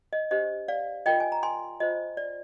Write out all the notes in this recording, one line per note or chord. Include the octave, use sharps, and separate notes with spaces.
D#5
D4 G4 C5 D#5
D5 F5
F4 A#4 D#5 G5
G#5
A#5
G#5 C6
F4 C5 D#5
D5